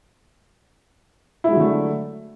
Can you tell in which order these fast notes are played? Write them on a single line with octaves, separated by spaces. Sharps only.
E4 G#3 F#3 D3 A3